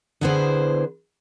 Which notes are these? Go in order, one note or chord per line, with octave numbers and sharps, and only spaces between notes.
D3 B3 E4 G#4 B4 C5